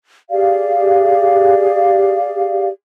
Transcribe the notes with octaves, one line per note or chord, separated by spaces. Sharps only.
G4 G#4 D5 F5